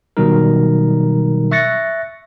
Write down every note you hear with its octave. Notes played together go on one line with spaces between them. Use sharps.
B2 D#3 F#3 G3 D#4 A#4
E5 C#6 F#6 A6 A#6 C#7